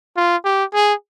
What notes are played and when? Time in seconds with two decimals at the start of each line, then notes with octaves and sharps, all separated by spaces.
0.17 F4
0.45 G4
0.74 G#4